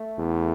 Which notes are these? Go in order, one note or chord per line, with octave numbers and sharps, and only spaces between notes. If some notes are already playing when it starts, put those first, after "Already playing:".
Already playing: A3
E2